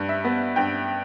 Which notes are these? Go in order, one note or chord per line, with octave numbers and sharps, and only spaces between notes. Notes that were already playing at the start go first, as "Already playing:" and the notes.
Already playing: G2 G3
E5
B3
G2 G5